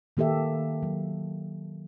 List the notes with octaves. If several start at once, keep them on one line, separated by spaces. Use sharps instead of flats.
D#3 A#3 G4 A4 E5
F#3